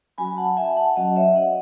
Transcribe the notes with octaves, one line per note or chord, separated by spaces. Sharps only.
F#3 C#4 F#4 G#5 B5
F#5 A5
E5 G#5
F#5 A5
F#3 C#4 F#4 D#5 F#5
C#5 E5
D#5 F#5